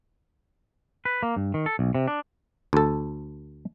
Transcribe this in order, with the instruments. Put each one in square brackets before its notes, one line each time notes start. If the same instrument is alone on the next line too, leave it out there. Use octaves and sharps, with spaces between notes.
[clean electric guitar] B4
A#3
G2
D#3
A4
B1
C3
D4
[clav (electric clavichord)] D2 A4